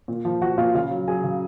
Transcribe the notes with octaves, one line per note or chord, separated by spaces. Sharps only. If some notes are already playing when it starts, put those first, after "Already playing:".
A#2
F3
F3 F#4 F#5
A#2 F4 F5
C#3 F4 F5
F#3
F#3 G#4 G#5
C#3